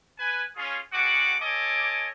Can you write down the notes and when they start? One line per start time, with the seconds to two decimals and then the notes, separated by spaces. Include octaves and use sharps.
0.19 B4 G#5
0.56 C#4 F4 G#4
0.93 G3 G#3 F#4 G#4 F#5 D6
1.40 A4 C#5 D#5 G#5 D6